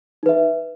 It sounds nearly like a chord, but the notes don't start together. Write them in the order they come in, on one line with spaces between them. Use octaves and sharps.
D#4 B4 E5